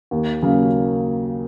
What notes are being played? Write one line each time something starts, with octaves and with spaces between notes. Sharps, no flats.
D#2
C#3 F#3 A#3